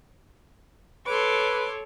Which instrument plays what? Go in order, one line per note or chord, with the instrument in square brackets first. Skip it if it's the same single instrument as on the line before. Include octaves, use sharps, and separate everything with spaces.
[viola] A4 C#5 [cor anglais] B4 [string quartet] C6 D6